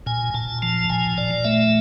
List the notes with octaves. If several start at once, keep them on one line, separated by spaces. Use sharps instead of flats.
A#2 G#5
A#2 A5
F3 A5
A#2 G#5
A#2 D5
A3 E5